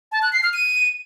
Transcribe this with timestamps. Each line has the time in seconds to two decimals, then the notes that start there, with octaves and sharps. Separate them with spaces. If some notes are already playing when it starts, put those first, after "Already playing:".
0.12 A5
0.22 F#6
0.33 C7
0.43 F6
0.53 D#7